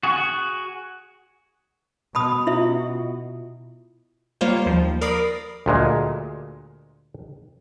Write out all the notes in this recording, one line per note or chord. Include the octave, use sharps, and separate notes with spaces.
F#4 G#4
B2 A5 B5 D#6
E4 F4 E5
G3 A#3 F4 C5 C#5
D#2 F3
A#4 D5 B5 D#6 C7
D2 A#2 G#3